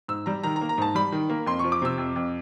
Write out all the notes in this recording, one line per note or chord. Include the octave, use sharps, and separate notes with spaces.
G#2 E6
G3 A#5
D#3 A#5
A#5
A#3
A#5
G#2 A5
G3 B5
D#3
A#3
F2 C6
F3 C#6
D6
C3 E6
F2
F2